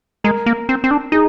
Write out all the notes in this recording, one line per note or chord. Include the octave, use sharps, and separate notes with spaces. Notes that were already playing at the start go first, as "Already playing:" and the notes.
G#3 A#4
A#3
C4
C4
D4
D#4 G#4